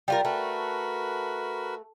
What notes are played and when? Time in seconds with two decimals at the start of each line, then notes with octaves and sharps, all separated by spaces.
0.08 G3 F4 A#4
0.25 A3 F#4 A#4 B4